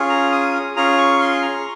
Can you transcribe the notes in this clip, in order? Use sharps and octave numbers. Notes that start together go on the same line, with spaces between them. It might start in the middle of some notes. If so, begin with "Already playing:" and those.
Already playing: C#4 F4 G#4
A#5
D#6
C#4 F4 G#4 A#5
C#6
C6
A#5